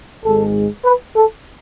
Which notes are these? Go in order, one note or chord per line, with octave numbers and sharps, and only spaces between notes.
G#1 G#2 G#3 A4
B4
A4